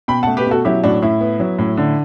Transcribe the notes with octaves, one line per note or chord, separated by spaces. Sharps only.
B2 G5 B5
A3 F#5 A5
G4 B4
B2 F#4 A4
F#3 E4 G4
A2 D4 F#4
A2 E4
B3
F#3
A2
D3